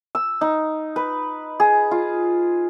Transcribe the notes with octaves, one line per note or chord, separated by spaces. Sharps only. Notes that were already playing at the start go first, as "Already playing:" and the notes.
E6
D#4
B4
G#4
F4